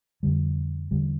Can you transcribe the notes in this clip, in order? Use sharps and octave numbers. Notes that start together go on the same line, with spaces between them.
F2 D3 G3
E2 D3 G3